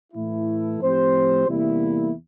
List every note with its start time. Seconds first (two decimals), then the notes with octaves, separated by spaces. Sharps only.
0.13 A2 E3 A3 E4
0.80 A2 F3 C4 G4 C5
1.47 E2 C3 G3 A#3 E4